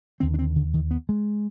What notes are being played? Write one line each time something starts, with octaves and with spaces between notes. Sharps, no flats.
D#2 D3 C4
D4
C4
D3
D#3
B3
G#3